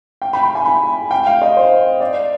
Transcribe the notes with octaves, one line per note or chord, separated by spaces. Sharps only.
G5
B5
B5
G#5
B5
G5
F5
D#5
C5
D5